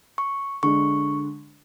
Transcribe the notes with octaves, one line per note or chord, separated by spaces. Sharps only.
C#6
D3 G#3 D4 C#6